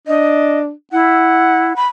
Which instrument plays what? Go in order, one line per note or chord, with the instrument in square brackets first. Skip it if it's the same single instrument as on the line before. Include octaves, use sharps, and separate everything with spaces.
[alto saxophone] D4 [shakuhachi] D#5
[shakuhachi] E4 [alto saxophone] F#5
[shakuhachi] B5